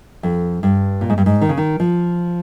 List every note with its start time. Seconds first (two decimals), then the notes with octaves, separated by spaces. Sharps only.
0.23 F2
0.63 G2
1.01 A#2
1.10 G#2
1.18 G2
1.26 G#2
1.41 D#3
1.49 C#3
1.57 D#3
1.80 F3